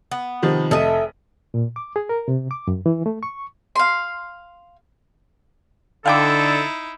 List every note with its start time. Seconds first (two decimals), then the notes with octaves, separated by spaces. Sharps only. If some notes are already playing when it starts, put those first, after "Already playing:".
0.11 B3
0.43 C3 D#3 F3
0.71 F1 A4 D#5 E5 D#7
1.54 A#2
1.76 D6
1.96 G#4
2.09 A#4
2.28 C3
2.51 D6
2.67 F#2
2.86 E3
3.06 A3
3.23 C#6
3.76 F5 C6
6.06 D3 D#4 E4 A4 F5 G5 D6